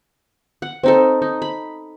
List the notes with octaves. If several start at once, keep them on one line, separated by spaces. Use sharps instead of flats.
F#5
C4 D#4 A4
D#4
B5